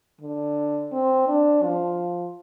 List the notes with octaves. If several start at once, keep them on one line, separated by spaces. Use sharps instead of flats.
D3
C4
D4
F3